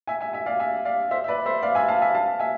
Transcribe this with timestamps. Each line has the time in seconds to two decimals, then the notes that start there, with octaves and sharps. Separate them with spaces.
0.07 E5 G#5
0.21 E5 G#5
0.33 E5 G#5
0.46 D5 F5
0.59 E5 G#5
0.85 D5 F5
1.11 C5 E5
1.24 E5
1.28 B4 D5
1.46 C5 E5
1.62 D5 F5
1.75 E5 G#5
1.88 F5 A5
2.02 E5 G#5
2.15 F5 A5
2.40 E5 G#5